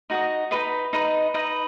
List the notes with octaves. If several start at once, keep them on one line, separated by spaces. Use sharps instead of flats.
D#4 F#4 D#5
D#4 F#4 B4 D#5
D#4 B4 D#5
D#4 B4 D#5